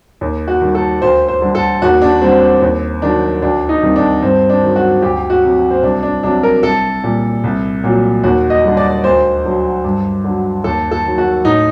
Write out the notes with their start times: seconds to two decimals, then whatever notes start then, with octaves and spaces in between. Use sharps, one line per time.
0.21 D#2
0.48 F#4
0.61 D#3 G3
0.75 A4
1.02 D2 C5
1.28 C5
1.41 D3 G3
1.55 A4
1.82 D#2 F#4
2.01 D4
2.22 D3 G3 C4
2.62 D#2
3.02 D#3 F#3 D4
3.42 D2 D4
3.69 D#4
3.82 C3 D#3 G3
3.96 D4
4.23 G2 C4
4.49 D4
4.63 D#3 F#3
4.76 F#4
5.02 D2 G4
5.30 F#4
5.43 C3 F#3
5.71 C4
5.83 C2 D4
6.03 D4
6.23 C3 F#3 D4
6.43 A#4
6.63 C2 A4
7.04 A#2 G3
7.44 C2
7.84 A#2 F#3
8.23 D#2 F#4
8.50 D#5
8.64 D3 G3
8.77 D5
9.04 D2 C5
9.44 D3 F#3
9.84 G2
10.24 D3 F#3
10.64 D#2 A4
10.91 A4
11.05 D#3 F#3
11.18 F#4
11.45 A2 D#4